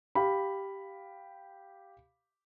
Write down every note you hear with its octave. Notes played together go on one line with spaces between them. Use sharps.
G4 F5 B5